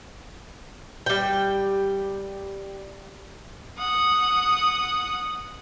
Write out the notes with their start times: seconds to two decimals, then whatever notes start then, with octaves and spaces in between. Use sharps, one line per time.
1.06 G3 G5
3.78 F#5 D#6